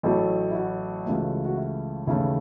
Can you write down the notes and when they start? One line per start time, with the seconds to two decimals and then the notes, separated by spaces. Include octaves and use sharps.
0.03 A1 A2 F#3 A3 A4
0.51 E4
0.55 F#4
1.06 C#2 C#3 E3 A3
1.45 F#4
1.56 E4
2.07 D#2 C#3 E3 A3 E4